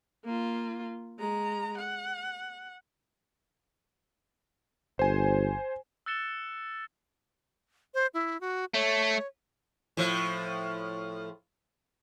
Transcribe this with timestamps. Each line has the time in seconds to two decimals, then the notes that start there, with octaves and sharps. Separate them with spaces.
0.25 A#3 F4
1.19 G#3 A#5
1.78 F#5
4.99 G1 C5 G#5
6.06 E6 F#6 A6 C#7 E7 G7
7.94 C5
8.14 E4
8.41 F#4
8.74 A3 C#5
9.97 A2 F3